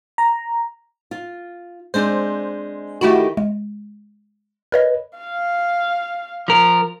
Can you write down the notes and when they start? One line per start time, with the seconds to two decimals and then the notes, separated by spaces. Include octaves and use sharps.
0.18 A#5
1.11 F4
1.94 G#3 C4 D4 C5
3.01 D#3 A3 E4 F#4 G4
3.37 G#3
4.72 A#4 B4 C#5 D#5
5.18 F5
6.48 F3 A#4